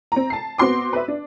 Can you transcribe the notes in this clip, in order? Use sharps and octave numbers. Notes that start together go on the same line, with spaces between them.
C4 A#5
A5 C7
B3 C4 F#4 C6 D6
B4 E5
D4